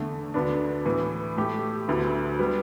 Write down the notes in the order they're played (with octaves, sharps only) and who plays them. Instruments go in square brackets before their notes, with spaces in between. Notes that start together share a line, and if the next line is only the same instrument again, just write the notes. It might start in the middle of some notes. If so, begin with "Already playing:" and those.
Already playing: [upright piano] E2 D3 A3
D2 D3 B3 D4
A2 E3 B3
A2 A3 G4
D2 D3 B3 E4
G3 B3